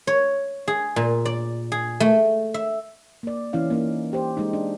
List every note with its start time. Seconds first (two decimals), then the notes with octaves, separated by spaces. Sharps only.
0.07 C#5
0.68 G#4
0.96 A#2
1.25 D5
1.72 G#4
2.00 A3
2.54 E5
3.23 A#3 D5
3.53 E3 C#4 E4 F5
3.70 A#3 C#4 D#4
4.13 G4 C5
4.37 G#3 D#4
4.53 D4